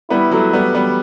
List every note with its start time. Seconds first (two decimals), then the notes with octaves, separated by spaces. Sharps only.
0.10 G3 B3 E4
0.31 F#3 A3
0.53 G3 B3
0.75 G3 B3